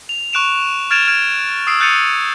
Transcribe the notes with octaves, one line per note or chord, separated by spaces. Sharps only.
F7
C#6 F#6 D7 E7 F7
F6 G#6 A6 D7 E7 F7
F6 G#6 D7
D#6 E6 C7 D7
F#6 G6 A6 C#7 D#7 F7